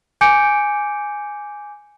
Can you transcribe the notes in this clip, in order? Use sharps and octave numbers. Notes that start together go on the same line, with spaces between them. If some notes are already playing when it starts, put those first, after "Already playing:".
G#5 D6 G6 C#7 D7